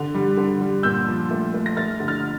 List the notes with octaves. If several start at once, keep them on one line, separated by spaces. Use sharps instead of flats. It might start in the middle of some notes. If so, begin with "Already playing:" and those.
Already playing: D3
G3
D3
G3
A#2 E6 G6
F3
A3
A3
A#6
A3 F6 A6
D3
F6 A6